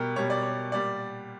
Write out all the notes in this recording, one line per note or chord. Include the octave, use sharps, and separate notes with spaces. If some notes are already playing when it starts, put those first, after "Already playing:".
Already playing: B2 G3 G4 A#4
B2 G3 C#5
D5
C#5
A#2 G3 D5